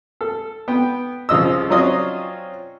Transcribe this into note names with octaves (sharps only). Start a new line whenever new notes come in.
A4
B3 G5
C2 C#3 F3 D#5 E6
F#3 C4 C#4 F4 D5 D#5